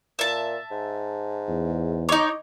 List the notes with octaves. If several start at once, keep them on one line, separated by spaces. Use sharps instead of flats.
A#2 E5 A5
G#2
E2
D#4 C#5 D#5 D6